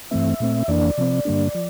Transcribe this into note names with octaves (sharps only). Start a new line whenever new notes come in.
G2 E3 A3 C4 E5
A#2 A3 C4
F2 E3 A#3 D4 D5
C3 F3 C4
G2 D3 G3 A#3 D4
F3